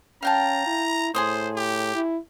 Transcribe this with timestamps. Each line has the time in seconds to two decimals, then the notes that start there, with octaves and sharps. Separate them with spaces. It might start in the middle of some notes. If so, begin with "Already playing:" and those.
0.23 C#4 F5 G5 A5 A#5
0.67 E4
1.15 A2 G#4 C5 C6 D#6
1.56 G4
1.95 E4